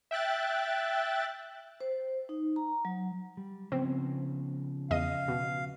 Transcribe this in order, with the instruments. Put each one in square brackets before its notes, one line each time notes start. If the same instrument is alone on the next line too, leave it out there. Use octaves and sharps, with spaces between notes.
[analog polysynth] E5 G5 F#6 A6
[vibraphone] C5
D#4
A#5
F#3
[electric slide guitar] G3
[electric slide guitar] C#3 F3 B3 [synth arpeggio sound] C4
[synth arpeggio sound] E2 D#5 D#7 [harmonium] F5
[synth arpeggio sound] B2